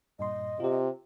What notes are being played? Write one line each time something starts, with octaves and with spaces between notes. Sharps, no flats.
G2 A#2 D#5 C6
C3 F4 G4